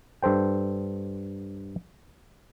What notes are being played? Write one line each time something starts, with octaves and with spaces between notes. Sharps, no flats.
G2 A4 C5 G5